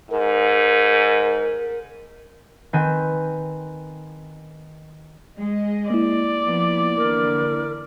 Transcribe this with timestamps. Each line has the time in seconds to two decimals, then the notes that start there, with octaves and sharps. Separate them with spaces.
0.11 G#2 A#4
2.73 D#3 C4 B4 G#5
5.37 G#3 D#5
5.90 A#3 E4 D5
6.44 F3 B3
6.97 D3 E3 A#4